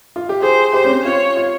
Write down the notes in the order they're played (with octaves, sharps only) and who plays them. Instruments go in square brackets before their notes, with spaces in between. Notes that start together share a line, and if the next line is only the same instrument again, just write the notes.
[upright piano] F4
G4
[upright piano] G#4 [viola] C5
[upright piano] G4 [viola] C5
[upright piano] C#4
C4
[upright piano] F4 [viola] C#5
[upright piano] F4